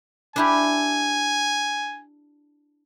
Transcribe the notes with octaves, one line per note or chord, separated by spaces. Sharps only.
D4 E4 G4 G#5